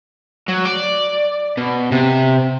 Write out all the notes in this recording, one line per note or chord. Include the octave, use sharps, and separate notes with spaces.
F#3
D5
B2
C3